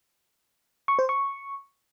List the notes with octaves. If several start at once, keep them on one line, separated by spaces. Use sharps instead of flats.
C#6
C5
C#6